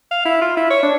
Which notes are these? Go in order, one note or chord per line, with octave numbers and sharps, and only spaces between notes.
F5
E4
F4
E4
C#5
D4